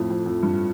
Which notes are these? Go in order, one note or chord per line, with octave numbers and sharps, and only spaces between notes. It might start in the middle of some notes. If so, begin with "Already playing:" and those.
Already playing: F2 A2
F2
F2
G2